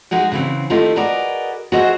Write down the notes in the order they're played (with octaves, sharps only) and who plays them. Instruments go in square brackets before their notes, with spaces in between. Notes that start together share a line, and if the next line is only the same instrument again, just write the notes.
[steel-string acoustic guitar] G#3 D#4 F#4 G#4
C#3 E3 C4
D#3 G3 A3 E4 F4 D#5
F#4 G#4 A#4 B4 D5 D#5
F#4 G#4 A#4 C5 D#5 E5